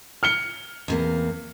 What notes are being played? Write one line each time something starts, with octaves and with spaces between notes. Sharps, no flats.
F6 C#7 G7
E2 C3 A#3